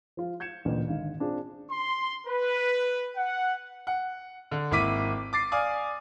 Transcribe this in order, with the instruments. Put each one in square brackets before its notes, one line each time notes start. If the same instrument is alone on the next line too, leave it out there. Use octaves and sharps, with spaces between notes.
[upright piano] F3 F4
G6 G#6 C#7 E7
A1 D2 A#2
G#1 D3 F5
C4 D4 F4 G#4
[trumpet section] C6
B4
F#5
[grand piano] F#5
D3
G#1 A#3 E4 D6 B6 D#7
D6 A6 C7
D5 F5 G#5 D6 D#6